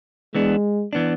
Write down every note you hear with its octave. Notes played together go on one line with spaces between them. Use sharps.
E3 G#3 B3 D4
E3 B3 D4